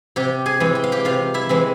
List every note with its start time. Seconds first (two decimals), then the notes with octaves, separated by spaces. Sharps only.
0.16 C3 G4 G5
0.46 G#4 G#5
0.60 E3 G#3 C4
0.75 G5
0.84 F5
0.92 G4 G5
1.05 C3 F4 F5
1.34 E4 E5
1.49 E3 G#3 C4